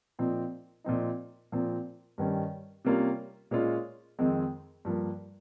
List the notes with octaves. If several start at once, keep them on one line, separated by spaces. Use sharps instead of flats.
A#2 F3 C4 D#4
A#2 F3 C4 D#4
A#2 F3 C4
G2 D#3 G3 C#4
C3 G3 A#3 C#4 F4
A#2 G#3 C#4 F4
F2 D#3 G#3 C4
G2 F3 A#3